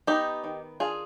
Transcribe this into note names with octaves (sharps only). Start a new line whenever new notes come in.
B3 D#4 G4
D#3
D4 F4 G#4